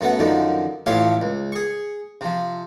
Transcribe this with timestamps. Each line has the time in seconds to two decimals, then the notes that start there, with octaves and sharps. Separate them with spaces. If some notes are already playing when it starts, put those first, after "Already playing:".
0.01 F#2 A3 B3 F#5
0.19 F#2 D3 D#3 F3
0.86 A1 F3 A3 G4 C#5 F5
1.22 C#2
1.52 G#4 C#6
2.21 C3 F3